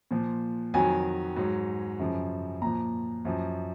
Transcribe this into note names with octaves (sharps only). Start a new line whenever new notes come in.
A#2 F3
F2 D#3 F#3 G#5
G#2 F#3
F#2 C#3 F3
A#2 F3 A#5
F#2 F3